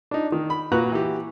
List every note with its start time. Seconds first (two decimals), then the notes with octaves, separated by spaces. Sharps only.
0.11 D4 D#4
0.32 D#3
0.50 B5
0.72 A#2 F#4 B4 A#5 F#6
0.92 E3 F#4 G4